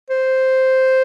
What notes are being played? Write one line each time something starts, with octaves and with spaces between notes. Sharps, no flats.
C5